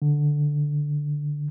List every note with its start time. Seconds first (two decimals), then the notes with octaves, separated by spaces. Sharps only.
0.02 D3